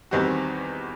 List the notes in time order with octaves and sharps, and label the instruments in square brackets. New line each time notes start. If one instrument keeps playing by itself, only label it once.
[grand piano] E2 D#3 G3 C4 F#4